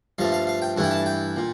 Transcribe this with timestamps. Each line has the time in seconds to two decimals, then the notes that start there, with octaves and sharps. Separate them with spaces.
0.18 G2 F3 A3 F5
0.32 F5
0.47 F5
0.62 G5
0.77 G2 E3 A3 E4
0.83 G5
0.91 A5
1.06 G5
1.37 A#2